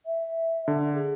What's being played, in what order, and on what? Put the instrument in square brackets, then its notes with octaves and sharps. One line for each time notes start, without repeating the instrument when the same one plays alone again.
[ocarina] E5
[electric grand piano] D3
[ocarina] G#4